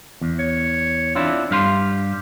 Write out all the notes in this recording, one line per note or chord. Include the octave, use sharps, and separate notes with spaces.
E2
C#5
C4 D4 E4 F4
G2 G4 F5 C6